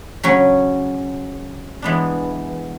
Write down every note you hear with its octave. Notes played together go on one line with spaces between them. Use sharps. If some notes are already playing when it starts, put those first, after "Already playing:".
C#3 F#3 C#4
E3 G#3 B3 D4